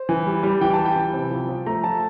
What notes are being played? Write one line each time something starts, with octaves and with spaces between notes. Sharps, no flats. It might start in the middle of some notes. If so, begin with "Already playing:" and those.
Already playing: C5
E3
G3
G3
E3 G5
A5
G3
G5
E3
C3
F3
F3
A3 A#5
F3 A5